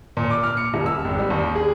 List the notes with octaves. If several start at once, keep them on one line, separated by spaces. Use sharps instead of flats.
A#2
D6
F6
C#7
D#1
E6
G#1
G3
D#2
G#4